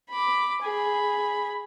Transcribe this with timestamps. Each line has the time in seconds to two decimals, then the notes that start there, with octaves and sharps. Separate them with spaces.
0.10 B5 D6
0.62 G#4 B5